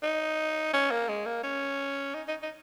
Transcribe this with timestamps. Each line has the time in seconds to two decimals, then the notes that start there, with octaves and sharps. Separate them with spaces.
0.03 D#4
0.73 C#4
0.91 A#3
1.08 G#3
1.26 A#3
1.43 C#4
2.14 D#4
2.28 D#4
2.42 D#4